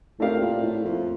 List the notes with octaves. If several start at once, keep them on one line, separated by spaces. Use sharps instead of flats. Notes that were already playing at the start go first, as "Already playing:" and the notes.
A2 A3 D4 G4 A#4 F5
A#2
A2
F2